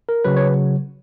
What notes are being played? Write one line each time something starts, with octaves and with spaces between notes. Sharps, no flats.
A#4
C#3 F#3 B4
C#5